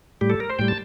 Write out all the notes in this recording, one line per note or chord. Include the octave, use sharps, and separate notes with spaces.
A2 G3 G4
A4
A#4
C5
A2 G3 G5
A5